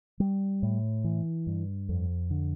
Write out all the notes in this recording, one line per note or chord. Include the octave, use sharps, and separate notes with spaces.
G3
A2
E3
G2
F2
D3